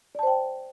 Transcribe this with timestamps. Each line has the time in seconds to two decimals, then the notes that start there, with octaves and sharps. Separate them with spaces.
0.15 D5
0.19 A5
0.23 C5
0.27 G5